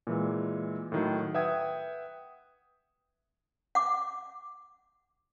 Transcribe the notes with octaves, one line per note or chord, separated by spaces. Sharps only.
A#2 E3 G#3
A2 D#3 F#3
B4 E5 F#5 G5 D#6 G#6
F#5 D6